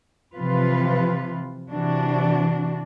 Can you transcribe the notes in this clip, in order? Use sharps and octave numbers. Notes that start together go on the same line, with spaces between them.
C3 E3 F3 F4 B4
C3 E3 D4 F#4